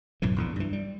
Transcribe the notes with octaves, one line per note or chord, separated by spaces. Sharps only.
B1 F#2 A2 E3
A#1 E2 D3
G2 E3
G3